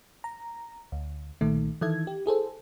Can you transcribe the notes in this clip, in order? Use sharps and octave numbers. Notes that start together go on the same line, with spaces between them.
A#5
D2
B1 A#2 D#3 A3
D#3 E3 A4 E5 G#6
G4
E4 G#4 A4 C5